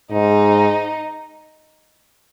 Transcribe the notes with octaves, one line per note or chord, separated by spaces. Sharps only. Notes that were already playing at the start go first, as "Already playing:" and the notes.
G#2 D#4